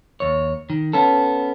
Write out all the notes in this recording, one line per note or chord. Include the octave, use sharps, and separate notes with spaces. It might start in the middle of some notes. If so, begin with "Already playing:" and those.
D#2 C#5
D#3
B3 C#4 A4